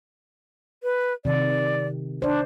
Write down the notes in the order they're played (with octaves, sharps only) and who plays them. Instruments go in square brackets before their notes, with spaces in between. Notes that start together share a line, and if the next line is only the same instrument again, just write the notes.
[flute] B4
[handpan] C3 D#3 [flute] D5
[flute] D4 [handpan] C5 D5